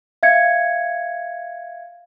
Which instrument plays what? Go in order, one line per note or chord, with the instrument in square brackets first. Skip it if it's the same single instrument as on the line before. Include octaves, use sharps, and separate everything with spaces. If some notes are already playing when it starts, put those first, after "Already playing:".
[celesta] E5 F5 G#6 C#7